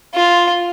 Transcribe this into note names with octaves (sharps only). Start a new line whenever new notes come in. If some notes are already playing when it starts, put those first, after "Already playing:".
F4